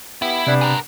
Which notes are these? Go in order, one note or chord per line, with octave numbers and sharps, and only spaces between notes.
B3 E4 G4
C3 G3 B3 D4
G#4 A#4